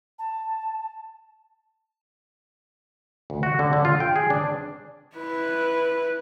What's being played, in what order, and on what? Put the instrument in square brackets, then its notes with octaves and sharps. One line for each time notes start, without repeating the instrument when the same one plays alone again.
[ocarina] A5
[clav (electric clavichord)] D2
F#4
D3
D3
F4
G5
G#4
D4
[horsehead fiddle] E4 B4